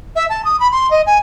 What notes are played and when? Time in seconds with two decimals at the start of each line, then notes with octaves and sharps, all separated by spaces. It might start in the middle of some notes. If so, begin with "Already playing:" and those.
0.15 E5
0.29 A5
0.44 D#6
0.59 B5
0.71 C6
0.90 D#5
1.06 G#5